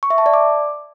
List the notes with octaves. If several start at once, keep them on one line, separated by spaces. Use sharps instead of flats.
C#6
E5
A5
D5
D6